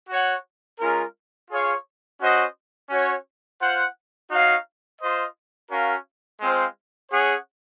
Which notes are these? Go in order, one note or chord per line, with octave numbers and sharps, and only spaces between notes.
F#4 C#5 F#5
G#3 C#4 F4 A#4
F4 G#4 C#5 F5
C#4 F#4 C5 D#5 F#5
C#4 F#4 C#5 F#5
F4 C5 F#5
D#4 F#4 C#5 F5
F4 C5 D#5
C#4 F#4 A#4 F5
G#3 C4 F4 C5 F5
C#4 G#4 C#5 F#5